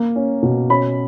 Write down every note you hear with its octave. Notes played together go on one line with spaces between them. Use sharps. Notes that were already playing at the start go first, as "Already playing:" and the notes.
Already playing: A#3
C#4
B2
C#4 B5